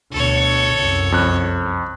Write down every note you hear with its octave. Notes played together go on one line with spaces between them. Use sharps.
D2 B2 A4 C#5
C2 F#2
F2 F#6